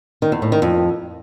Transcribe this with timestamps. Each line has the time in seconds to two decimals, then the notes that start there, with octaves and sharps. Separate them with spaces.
0.22 D#3
0.32 E2
0.42 A2
0.52 D#3
0.62 F2